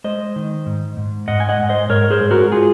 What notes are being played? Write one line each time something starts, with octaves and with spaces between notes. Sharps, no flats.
G#3 C5 D#5
D#3
G#2
G#2
G#2 D#5 F#5
G#5
D#5 F#5
G#2
C5 D#5
G#2 A#4 C#5
G#4 C5
G#3
F#4 A#4
F4 G#4